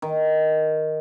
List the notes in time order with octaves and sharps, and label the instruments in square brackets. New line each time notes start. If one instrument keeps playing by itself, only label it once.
[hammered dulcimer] D#3